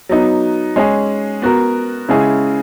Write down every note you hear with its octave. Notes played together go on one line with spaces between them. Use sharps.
F#3 B3 D#4
G#3 C#4 G#4
B3 F#4 A#4
C#3 G#3 C#4 E4 G#4